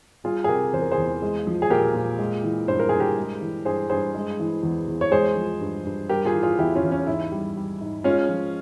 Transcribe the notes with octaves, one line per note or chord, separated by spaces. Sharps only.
G3 F4 G#4
G#4
C3 G4 A#4
E2 C5
A#4
G#4 C5
E2
G#3
F3
G#4
A#2 G4 A#4
A#2
G#3
E3
G2 C5
A#4
G2 G#4
G4 A#4
G#3
E3
G2 G#4 C5
G2 G#4 C5
G#3
E3
E2
E2
C#5
G#3 G#4 C5
F3
G2
G2
G3 G4 A#4
F4 G#4
E3
F4 G#4
E2 E4 G4
C#4 F4
E2
C#4
G#2 E4
G3
G3
G#2
G#3 C#4 F4
F3